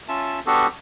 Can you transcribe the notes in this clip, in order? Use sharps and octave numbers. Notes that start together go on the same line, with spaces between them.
C#4 F4 E5 A5
B3 D4 F#4 G4 A4